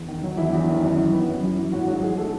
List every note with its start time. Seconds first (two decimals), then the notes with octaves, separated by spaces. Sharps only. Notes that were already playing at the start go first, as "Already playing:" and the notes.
Already playing: E2
0.08 D#3
0.23 F#3
0.37 E2 E4
0.53 E2
0.68 D#3
0.83 F#2
0.97 E3
1.13 B3
1.28 F#2
1.43 F#2
1.58 E3
1.72 G#1 F#3 F#4
1.87 G#2 F#3 F#4
2.02 E3 G#3 G#4
2.17 A3 A4